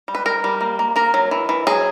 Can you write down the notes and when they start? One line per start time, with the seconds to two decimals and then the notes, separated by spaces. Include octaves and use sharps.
0.08 G3
0.15 B4
0.26 G3 A#4
0.44 G3
0.61 A#3
0.79 A#3
0.96 A#3 A#4
1.14 F#3
1.31 E3
1.49 E3
1.67 F#3 G#4